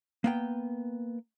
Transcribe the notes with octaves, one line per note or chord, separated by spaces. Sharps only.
A#3 B3 G5